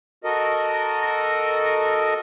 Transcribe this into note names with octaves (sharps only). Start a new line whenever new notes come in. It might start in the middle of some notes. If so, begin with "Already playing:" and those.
F#4 A4 A#4 D#5